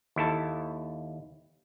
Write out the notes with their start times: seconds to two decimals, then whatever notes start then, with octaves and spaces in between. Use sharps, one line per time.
0.16 D#2 E4 A4 A5